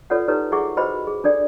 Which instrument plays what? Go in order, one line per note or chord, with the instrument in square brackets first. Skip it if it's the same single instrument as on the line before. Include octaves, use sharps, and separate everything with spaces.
[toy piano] F4 A4 B4 C#5 D5 F#5
D#4 E4 G4 A4 B4 C#5
E4 G#4 E5 F#5 C#6 D6
F#4 B4 C5 D#5 G5 B5
G#4
D4 A4 D5 G5